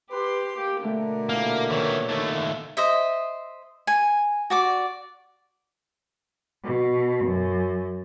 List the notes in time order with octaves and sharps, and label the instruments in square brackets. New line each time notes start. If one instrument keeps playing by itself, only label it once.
[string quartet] G4 C6 [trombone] B4
[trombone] A#3 [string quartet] G4
[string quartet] B2 D3 A#4 [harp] A3
[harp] A#2 [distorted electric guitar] A#3 [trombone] E4
[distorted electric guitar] D#3 E3 [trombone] C#5
[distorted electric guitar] D#2 A3
[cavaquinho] C5 D#5 E5
G#5
F#4 D5 D6
[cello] B2
F#2